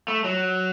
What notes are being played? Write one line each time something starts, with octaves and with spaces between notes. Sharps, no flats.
A3
F#3